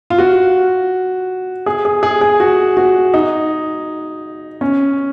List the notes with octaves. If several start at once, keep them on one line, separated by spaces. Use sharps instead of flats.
F4
F#4
G#4
G#4
G#4
G#4
F#4
F#4
D#4
C#4